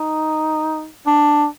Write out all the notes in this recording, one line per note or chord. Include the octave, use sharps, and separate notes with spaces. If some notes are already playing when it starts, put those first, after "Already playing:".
Already playing: D#4
D4